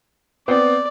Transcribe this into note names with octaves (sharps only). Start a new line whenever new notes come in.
B3 C4 D5